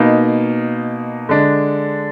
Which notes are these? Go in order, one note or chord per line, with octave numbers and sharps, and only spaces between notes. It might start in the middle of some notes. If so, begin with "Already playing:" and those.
Already playing: B2 A#3 D#4
D3 G#3 D4